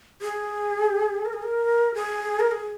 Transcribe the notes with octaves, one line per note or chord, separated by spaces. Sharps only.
G#4
A#4
G#4
A#4
G#4
A#4
G#4